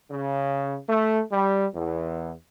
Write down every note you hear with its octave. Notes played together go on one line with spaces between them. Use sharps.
C#3
A3
G3
E2